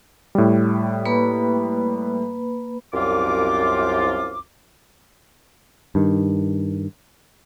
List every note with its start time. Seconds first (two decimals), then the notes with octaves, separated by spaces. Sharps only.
0.35 A2 G3
1.05 A#3 B4 B5
2.94 C2 F#2 F4 D6
5.95 G2 D#3